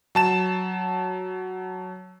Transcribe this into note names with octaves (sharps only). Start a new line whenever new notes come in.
F#3 A5 E7